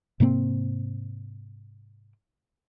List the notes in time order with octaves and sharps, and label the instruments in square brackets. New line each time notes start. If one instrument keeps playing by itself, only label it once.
[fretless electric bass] G#2 C3 A#3 C4